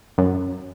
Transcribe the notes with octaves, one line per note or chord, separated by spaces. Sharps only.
F#2